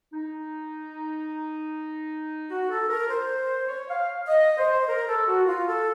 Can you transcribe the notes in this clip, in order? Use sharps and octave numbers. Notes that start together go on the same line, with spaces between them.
D#4
F#4
A4
A#4
C5
C#5
F5
D#5
C5
A#4
A4
F#4
F4
A4